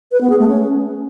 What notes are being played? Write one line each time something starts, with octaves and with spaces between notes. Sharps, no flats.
B4
B3
G#4
A3
C#4